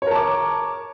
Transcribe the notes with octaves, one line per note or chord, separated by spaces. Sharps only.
A#4 C#5 A5 D6